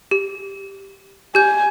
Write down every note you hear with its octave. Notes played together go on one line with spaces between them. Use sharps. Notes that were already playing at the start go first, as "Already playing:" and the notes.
G4
G4 G#5 G6